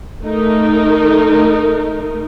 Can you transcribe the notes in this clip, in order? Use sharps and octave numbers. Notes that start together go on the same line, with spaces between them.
A3 D#4 A#4